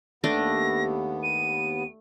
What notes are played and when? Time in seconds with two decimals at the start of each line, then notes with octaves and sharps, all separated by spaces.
0.24 D#2 A3 B3 D4 A#6
1.23 D#7